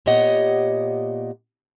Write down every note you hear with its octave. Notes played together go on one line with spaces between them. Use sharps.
A#2 B3 G4 C#5 D#5 F#5